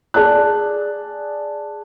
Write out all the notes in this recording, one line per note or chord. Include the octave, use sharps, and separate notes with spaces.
G#4 D5 A5 F#6